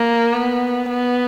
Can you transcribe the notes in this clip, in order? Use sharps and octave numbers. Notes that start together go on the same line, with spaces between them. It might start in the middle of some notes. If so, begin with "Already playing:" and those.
Already playing: A#3
B3
B3